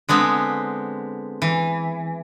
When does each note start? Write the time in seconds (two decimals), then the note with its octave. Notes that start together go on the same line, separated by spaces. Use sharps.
0.09 D3 G#3 B3 C4
1.42 E3